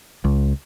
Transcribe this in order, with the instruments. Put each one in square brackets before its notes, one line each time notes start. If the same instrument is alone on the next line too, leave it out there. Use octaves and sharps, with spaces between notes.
[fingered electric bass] C#2